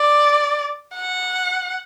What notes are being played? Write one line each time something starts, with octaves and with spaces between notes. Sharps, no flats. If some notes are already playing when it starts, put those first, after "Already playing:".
Already playing: D5
F#5